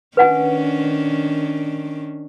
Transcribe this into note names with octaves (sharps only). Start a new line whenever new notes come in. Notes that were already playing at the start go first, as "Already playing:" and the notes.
D#3 C#4 D4 B4 F#5 G#5